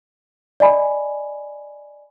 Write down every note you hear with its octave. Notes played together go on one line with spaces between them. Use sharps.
D5 D#5 G#5 B5